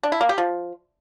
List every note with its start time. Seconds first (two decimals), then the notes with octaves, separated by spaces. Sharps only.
0.03 D4
0.12 E4
0.21 A#3
0.29 G4
0.38 F3